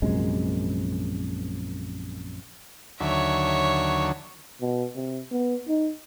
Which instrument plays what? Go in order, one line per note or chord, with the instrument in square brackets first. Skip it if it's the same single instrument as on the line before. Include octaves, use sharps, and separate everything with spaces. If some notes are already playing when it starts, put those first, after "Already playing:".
[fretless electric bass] A#1 F#2 C3 G#3
[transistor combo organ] D#2 D3 F#3 [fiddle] C#5 E5
[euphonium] B2
C3
B3
D#4